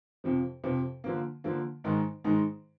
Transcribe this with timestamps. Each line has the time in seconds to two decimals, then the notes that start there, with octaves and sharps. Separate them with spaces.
0.24 F2 C3 F3
0.64 F2 C3 F3
1.04 D3 F3 A#3
1.44 D3 F3 A#3
1.84 G#2 D#3 G#3 D#4
2.24 G#2 D#3 G#3 D#4